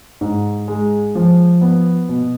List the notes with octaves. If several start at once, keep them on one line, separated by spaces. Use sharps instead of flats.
G#2
G#3
F3
B3
B2